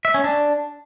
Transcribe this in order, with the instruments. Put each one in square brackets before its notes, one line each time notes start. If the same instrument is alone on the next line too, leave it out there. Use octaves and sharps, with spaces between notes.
[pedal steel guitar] E5
C#4
D4